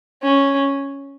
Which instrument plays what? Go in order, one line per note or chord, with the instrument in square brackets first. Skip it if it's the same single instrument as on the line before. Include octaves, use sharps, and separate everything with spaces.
[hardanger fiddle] C#4